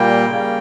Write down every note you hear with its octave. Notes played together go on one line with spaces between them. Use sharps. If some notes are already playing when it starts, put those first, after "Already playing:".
Already playing: A#2 G3 A#3 G5
C#3 G3 A#3